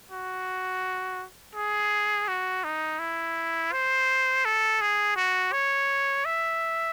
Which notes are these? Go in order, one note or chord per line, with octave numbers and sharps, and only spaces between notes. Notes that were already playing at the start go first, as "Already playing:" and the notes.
F#4
G#4
F#4
D#4
E4
C5
A4
G#4
F#4
C#5
E5